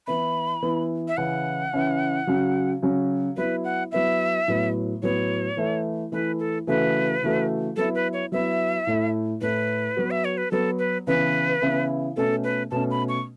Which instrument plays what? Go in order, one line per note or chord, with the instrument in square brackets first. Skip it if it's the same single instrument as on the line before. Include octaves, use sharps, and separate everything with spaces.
[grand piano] E3 B3 E4 [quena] B5
[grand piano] E3 B3 E4
[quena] E5
[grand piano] C#3 E3 C#4 E4 [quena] F#5
[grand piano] C#3 E3 C#4 E4
C#3 F#3 C#4 F#4
C#3 F#3 C#4 F#4
[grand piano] F#3 B3 E4 [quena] B4
[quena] F#5
[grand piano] F#3 B3 E4 [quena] E5
[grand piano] A2 F#3 B3
[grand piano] A2 F#3 B3 [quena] C#5
[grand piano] E3 A3 E4
[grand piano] E3 A3 E4 [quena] B4
[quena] A4
[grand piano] C#3 E3 A3 F#4 [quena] B4
[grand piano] C#3 E3 A3 F#4
[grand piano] F#3 B3 E4 [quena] A4
[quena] B4
C#5
[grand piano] F#3 B3 E4 [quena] E5
[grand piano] A2 A3 E4
[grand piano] A2 A3 E4 [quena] B4
[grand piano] F#3 B3 F#4
[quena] E5
C#5
B4
[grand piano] F#3 B3 F#4 [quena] A4
[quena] B4
[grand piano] C#3 E3 B3 E4 [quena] B4
[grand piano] C#3 E3 B3 E4
[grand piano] B2 A3 C#4 [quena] A4
[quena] B4
[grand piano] B2 A3 C#4 [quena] A5
[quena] B5
C#6